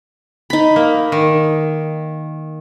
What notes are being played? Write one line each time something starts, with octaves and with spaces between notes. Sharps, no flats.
D#4 B5
A#3
D#3